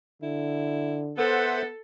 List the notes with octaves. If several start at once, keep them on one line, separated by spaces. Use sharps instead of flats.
D3 E4
B3 A4 C5 E5 F#5